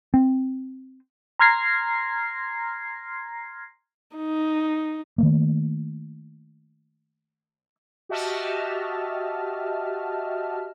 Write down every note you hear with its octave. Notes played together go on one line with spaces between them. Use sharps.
C4
A#5 C6 F6 G#6 A#6 C7
D#4
D#3 A3 A#3
F#4 G4 D#5 E5 A5 F6